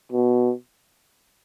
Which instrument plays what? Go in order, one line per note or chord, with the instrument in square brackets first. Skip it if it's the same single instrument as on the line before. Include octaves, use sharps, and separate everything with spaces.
[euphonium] B2